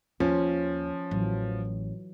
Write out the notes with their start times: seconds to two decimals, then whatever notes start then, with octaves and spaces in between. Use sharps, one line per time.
0.20 D#2 F3 C#4 F4
1.11 A1 E3 F#3